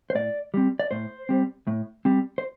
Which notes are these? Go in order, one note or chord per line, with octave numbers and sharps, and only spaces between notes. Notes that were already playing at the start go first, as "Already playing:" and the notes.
C5
A2 D5
G3 C4
D5
A2 C5
G3 C4
A2
G3 C4
C5